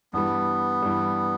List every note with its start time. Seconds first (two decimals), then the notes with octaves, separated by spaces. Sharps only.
0.13 G2 E3 G3 B3
0.82 G2 E3 G3